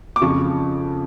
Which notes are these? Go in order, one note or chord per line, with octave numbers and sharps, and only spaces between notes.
D6
F2 C#3 F3 C#6